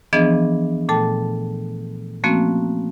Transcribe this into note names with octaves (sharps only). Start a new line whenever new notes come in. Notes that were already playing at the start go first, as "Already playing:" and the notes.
E3 F3 B3 D4 G#4 D#5
A#2 A3 A4 G5 A5
F3 A3 A#3 C4 C#4 F#4